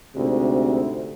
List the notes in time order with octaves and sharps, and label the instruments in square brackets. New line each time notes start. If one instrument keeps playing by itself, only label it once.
[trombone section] D2 G#2 C3